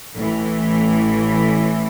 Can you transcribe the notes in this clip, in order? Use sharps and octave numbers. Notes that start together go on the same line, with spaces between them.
A1 A2 E3